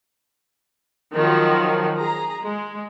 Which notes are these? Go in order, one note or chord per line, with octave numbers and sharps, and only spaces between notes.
D#3 F3 F#3
G#4 A#5
G#3